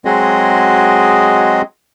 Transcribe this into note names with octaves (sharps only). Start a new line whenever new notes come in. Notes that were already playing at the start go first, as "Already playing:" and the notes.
F#3 G#3 C4 F#4 G#4 D#5